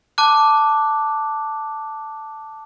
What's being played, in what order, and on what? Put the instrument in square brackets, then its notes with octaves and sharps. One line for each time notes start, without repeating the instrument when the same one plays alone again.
[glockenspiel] A5 D6 F#6